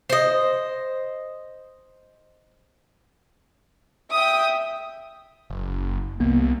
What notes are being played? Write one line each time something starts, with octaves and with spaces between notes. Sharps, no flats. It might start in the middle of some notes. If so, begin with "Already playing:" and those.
C5 D#5
E5 G5 D#6
F#1
C2 A#3 B3